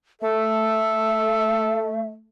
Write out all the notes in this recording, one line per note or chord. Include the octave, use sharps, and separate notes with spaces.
A3 A4 E5